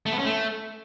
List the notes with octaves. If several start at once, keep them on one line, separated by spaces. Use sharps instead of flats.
A3
B3
C#4
A3